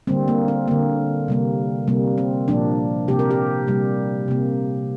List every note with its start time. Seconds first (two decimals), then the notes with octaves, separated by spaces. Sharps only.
0.07 D3 G3 A#3 C4
0.28 A#3
0.48 C4
0.68 D3 A#3
1.28 C3 G3 A#3
1.88 C3 G3 A#3
2.18 C4
2.48 A#2 F3 A#3 D4
3.08 C3 A#3 G4
3.19 A#4
3.31 G4
3.67 C3 G3 A#3
4.28 C3 A#3